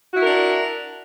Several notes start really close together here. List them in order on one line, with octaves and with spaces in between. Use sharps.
F#4 E4 A#4 D4